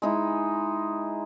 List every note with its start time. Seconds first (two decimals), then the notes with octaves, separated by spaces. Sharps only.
0.02 G#3 D#4 E4